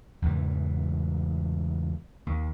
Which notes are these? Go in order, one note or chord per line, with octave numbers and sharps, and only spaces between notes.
E2 G#2 C#3 E3
D#2